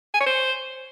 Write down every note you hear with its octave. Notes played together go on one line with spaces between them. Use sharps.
G#5
C#5
C5